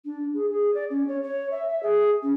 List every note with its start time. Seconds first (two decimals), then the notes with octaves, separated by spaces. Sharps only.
0.05 D4
0.34 G#4
0.49 G#4
0.74 D5
0.90 C#4
1.08 C#5
1.23 C#5
1.51 E5
1.69 E5
1.83 G#4
2.23 C#4